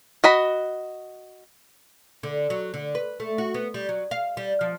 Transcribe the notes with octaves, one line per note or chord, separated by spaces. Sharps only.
F#4 D#5 B5
D3
F#3
D3
B4
A3
F#4
B3
G3
F#3
F5
G3
F3